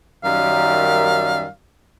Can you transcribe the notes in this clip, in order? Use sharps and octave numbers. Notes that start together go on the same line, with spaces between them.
F#2 D#3 G3 F5